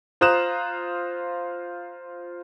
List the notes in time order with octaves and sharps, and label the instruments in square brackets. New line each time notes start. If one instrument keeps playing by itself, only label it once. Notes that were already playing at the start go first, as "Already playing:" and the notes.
[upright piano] F4 C5 A#5 D#6 F#6 E7